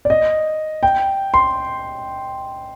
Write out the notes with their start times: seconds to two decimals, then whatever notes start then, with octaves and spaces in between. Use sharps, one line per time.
0.05 D5
0.10 D#5
0.83 G5
1.34 C6